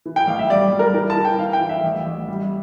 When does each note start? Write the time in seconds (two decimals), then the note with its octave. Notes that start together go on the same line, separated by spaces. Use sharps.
0.05 E3
0.16 G5
0.27 A1 F5
0.39 E5
0.50 G3 D5
0.72 G3
0.79 A#4
0.94 E3 A#4
1.10 A5
1.16 E3
1.25 G5
1.39 E3 F5
1.53 G5
1.61 E3
1.69 E5
1.84 A1
2.06 A1
2.28 G3